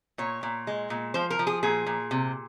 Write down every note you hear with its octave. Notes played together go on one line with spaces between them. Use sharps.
A#2 C#5
A#2
G#3
A#2
F3 C5
A#4
F3
G#4
A#2 G#4
A#2
C3